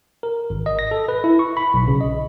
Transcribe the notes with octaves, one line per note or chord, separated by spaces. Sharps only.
A#4
G#1
D#5
A#6
A4
B4
E4
C#6
B5
B1
C#3
D#5